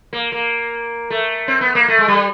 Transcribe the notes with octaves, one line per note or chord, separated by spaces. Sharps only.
A#3
A#3
A3
C4
B3
A#3
A3
G#3
G3